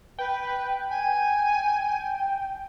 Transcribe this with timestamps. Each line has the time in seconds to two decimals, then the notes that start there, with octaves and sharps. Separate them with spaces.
0.19 B4 G5
0.90 G#5